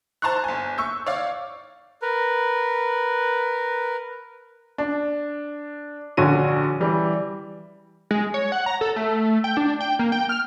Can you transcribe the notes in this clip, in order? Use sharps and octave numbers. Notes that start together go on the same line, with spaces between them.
C5 A5 A#5 C6 C#6 F#6
G1 G#5
C#6 E6 G6
C#5 D5 F5
A#4 B4
D4
A#1 D3 C#4 F#4 D#7
E3 G3
G#3
C#5
F#5
A#5
A4
A3
G5
D4
G5
A#3
G5
F6